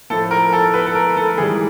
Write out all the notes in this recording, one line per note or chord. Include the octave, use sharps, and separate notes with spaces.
A2 F3 A4
A#4
A4
B4
A4
A#4
A4
G#2 E3 G3 G#4